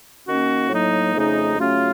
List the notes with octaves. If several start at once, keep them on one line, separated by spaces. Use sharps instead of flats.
D#3 A#3 C#4 F#4
A2 F#3 A#3 D#4
F2 C#3 A3 D#4
C#3 F#3 A3 C#4 F4